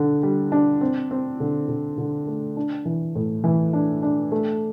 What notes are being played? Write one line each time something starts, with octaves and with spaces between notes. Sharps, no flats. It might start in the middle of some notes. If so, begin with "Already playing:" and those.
Already playing: D3 D4
G3
D4
C4
C4
D3
D3
D3
A3
D4
E3
A2
E3
D4
D4
A3